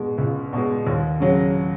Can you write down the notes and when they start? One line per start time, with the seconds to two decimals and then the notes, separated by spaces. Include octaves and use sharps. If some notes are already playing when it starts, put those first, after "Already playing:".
Already playing: B2 G#3
0.18 C#2
0.53 B2 G#3
0.87 D#2
1.20 C#3 F#3